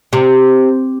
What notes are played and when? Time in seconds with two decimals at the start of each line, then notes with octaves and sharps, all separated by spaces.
0.13 C3